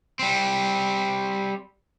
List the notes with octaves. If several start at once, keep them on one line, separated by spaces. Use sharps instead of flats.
G3 C4